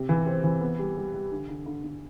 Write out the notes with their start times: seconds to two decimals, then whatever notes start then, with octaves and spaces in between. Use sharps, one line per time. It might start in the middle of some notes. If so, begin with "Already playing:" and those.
Already playing: C3
0.09 E3
0.26 C4
0.44 E3
0.61 B3
0.79 G3
0.97 G3
1.14 G3
1.32 D3
1.49 D3
1.66 D3
1.84 D3